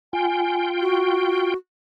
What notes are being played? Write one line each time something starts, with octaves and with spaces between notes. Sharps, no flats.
F4 G5 G#5
F#4